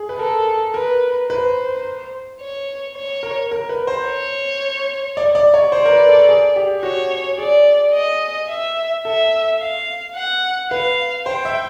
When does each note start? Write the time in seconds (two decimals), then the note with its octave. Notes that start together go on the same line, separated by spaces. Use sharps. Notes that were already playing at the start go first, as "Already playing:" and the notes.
Already playing: G#4
0.09 B4
0.18 A4 A#4
0.74 A#4 B4
1.30 B4 C5
2.40 C#5
2.96 C#5
3.23 A#4
3.51 A#4
3.69 B4
3.87 C5
4.06 C#5
5.17 D5
5.35 D5
5.54 C#5
5.72 C5 D5
5.85 A#4
5.91 B4
6.09 A4
6.28 G#4
6.56 G4
6.83 F#4 C#5
7.38 G#4 D5
7.94 D#5
8.49 E5
9.05 A4 E5
9.60 F5
10.16 F#5
10.71 B4 F5
11.26 C5 G5
11.45 E5